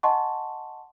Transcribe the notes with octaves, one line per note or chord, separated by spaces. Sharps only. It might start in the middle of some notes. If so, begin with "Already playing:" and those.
D#5 F#5 G#5 A5 C6 C#6